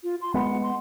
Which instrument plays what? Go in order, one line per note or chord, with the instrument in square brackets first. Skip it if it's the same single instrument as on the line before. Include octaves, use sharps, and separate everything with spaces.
[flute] F4
C6
[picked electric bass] G#3 B3 [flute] F#5
[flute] C6